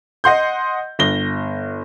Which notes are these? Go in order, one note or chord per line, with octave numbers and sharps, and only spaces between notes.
D#5 F#5 C6 G6
G1 A#6 G7